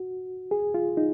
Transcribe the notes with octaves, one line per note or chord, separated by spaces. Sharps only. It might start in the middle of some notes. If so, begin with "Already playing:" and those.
Already playing: F#4
G#4
F4
D#4